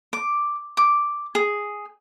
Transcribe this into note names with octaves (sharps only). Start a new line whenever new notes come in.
D6
D6
G#4